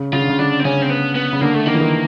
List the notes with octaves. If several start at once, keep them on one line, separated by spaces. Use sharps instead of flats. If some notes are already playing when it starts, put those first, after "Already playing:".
Already playing: C#3
C#3 F4
D3
C#3
D3 D4
C4
C#3 C#4
C4
B3
B3
C#3
D3 A#3
A3
D#3 A#3
E3
D#3